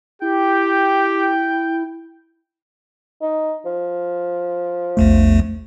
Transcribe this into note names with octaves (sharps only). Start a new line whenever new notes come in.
E4 G4 G5
D#4
F3
A#1 E2 A3